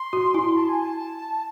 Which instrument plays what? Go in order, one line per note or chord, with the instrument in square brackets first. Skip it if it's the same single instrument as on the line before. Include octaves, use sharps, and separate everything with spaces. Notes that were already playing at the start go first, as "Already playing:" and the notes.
Already playing: [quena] C6
[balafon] F#4
E4
[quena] A5
G#5
A5